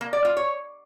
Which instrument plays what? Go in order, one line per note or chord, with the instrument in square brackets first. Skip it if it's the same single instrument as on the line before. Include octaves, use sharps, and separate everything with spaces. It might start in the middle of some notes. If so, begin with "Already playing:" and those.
[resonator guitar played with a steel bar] A#3
D5
F4
C#5